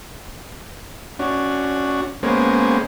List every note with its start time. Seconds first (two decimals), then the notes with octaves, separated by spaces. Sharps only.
1.19 C#4 D4 F#4
2.23 G#3 A#3 B3 C#4 C5